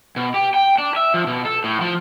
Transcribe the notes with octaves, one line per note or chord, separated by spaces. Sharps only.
B2
G4
G5
D4
E5
F3
B2
A4
A2
F3